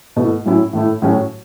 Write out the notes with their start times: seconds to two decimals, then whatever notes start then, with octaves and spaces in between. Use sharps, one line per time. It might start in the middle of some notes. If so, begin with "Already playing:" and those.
0.16 B2 A3 E4
0.45 A2 F#3 C#4 E4
0.73 A2 A3 E4
1.02 A2 F#3 C#4 F#4